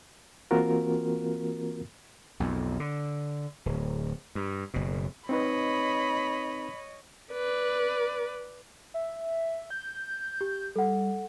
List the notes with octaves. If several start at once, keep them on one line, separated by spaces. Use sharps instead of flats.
E3 A#3 C4 F4 F#4 A#4
B1 F2
D3
D1
G2
F#1 B2
C4 D#4 B4 C#5 D#5 B5
B4 D5
E5
G6
G4
G3 A4 F#5